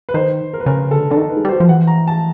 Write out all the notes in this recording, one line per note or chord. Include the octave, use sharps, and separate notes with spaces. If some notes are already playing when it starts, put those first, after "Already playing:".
B4
D#3 C5
A#4
B4
C#3 A#4
D3 A4
D3 A4
D#3
B4
G#3
G3
C5
F#3
F3
E3 F#5
A#5
A5